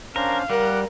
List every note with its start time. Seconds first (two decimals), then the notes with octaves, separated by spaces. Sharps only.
0.16 C#4 D4 A#4 C5 F5
0.50 G3 A#4 F#5 D6 F#6